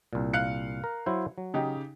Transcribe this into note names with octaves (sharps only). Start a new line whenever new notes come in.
C2 A#2
F5 F#6 C#7
A#4
F#3 E4 C5
F#3
C#3 D#4 G4